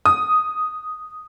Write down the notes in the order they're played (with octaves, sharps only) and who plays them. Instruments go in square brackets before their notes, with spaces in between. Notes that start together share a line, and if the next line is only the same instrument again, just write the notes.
[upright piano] D#6